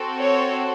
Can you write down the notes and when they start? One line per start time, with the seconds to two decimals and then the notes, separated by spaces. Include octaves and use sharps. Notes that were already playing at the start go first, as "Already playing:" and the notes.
Already playing: C4 F#4 A4
0.20 C#5